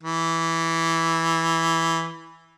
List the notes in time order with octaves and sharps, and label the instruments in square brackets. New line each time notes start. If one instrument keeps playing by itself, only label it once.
[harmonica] E3